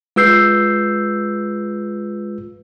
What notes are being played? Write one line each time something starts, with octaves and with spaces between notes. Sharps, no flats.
G#3 F4 B4 E6 G6 C7